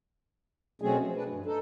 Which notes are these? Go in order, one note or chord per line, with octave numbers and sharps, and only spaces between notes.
B2 F#3 A3 C4 C#4 G#4
F3
D4 B4
G2
D#4 A4